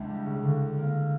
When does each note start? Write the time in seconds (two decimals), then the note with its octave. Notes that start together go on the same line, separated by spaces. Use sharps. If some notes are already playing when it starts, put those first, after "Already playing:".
Already playing: C#2 D4 E4
0.10 G3
0.26 C#3
0.43 D3
0.78 A#3